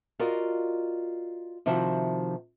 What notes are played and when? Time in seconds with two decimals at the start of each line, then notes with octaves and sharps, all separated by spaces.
0.19 F4 F#4 A#4 D5 D#5 F5
1.66 C3 D#3 F3 E4 F#4